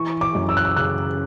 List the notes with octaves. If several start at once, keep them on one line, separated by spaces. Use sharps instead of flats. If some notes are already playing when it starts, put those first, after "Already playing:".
Already playing: E3 C#6
D6
F#2
E6
F#6
E6
C#3 F#6